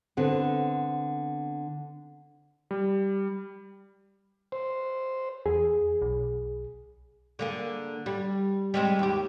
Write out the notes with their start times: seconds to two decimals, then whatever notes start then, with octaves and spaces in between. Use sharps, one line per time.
0.17 D3 B3 C4
2.71 G3
4.52 C5
5.46 E2 G#4
6.02 B1
7.39 D3 A#3 G#4
8.06 G3
8.74 G3 G#3 C4
8.99 D#2 G4